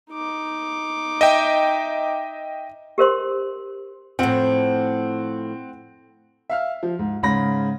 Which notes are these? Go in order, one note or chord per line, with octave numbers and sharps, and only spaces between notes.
D#4 D6
D#5 E5 G5
G4 A#4 C5 C6
A2 F3 C4 F#5
E5 F5 F6
F3
G#2
G#2 C#3 B5 A#6